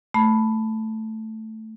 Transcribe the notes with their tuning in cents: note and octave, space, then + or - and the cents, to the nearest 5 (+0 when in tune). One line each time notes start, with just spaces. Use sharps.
A3 +0 B5 +0